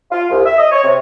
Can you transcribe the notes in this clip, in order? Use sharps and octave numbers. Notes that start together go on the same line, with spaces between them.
F4
C2
E5
D#5
C#5
C3